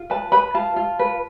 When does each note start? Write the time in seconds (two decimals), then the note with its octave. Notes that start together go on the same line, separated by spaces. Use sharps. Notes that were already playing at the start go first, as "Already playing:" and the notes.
Already playing: F4
0.10 B4 A5
0.32 B4 B5
0.54 F4 A5
0.76 F4
0.99 B4